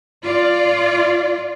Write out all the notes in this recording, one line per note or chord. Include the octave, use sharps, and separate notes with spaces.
F4 D5